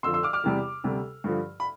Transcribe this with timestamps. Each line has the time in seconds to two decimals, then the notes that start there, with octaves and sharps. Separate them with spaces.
0.03 F2 D3 F3 C6 E6
0.14 C6 E6
0.23 D6 F6
0.33 D6 F6
0.44 E2 C3 G3
0.84 D2 C3 G3
1.24 G2 D3 F3
1.60 B5